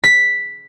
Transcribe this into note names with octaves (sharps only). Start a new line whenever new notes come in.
B6